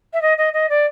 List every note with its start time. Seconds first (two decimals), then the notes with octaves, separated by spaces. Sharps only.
0.13 E5
0.22 D#5
0.38 D#5
0.53 D#5
0.69 D5